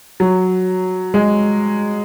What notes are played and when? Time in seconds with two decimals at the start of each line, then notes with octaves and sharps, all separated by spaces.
0.20 F#3
1.14 G#3